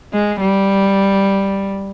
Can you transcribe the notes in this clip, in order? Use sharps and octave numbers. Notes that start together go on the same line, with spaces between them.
G#3
G3